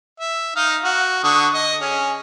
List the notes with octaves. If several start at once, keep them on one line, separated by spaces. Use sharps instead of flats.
E5
D#4 D#5 F5
F#4
D3 C#6 D#6
D#5
C#4 G#4